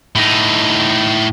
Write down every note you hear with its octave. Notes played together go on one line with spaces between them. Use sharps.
A2 D#4